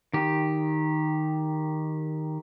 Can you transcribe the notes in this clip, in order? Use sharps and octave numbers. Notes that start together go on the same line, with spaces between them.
D#3 G4